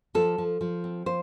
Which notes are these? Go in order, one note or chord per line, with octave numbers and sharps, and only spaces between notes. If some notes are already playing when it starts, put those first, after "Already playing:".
F3 A4
F3
F3
C4
F3 C5